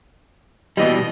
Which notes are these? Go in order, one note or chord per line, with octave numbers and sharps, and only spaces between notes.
B2 E3 G3 D#5